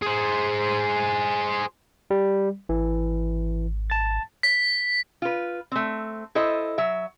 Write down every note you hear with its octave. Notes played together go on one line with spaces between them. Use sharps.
G#4 C5
G3
G#1 E3
A5 A6
B6
F4 B4
A3 C4
E4 A4 C5 D#5
F#3 E5